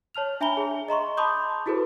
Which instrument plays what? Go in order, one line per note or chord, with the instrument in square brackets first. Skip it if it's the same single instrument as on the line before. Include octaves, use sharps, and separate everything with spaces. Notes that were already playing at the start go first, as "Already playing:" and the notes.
[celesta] C#5 A5 F6 F7
D4 E5 G#5 A#5 B5 G7
G#4
D#5 A#5 C6 C#6
A5 B5 C6 D6 D#6 G6
E4 F#4 G#4 A4 B4 C5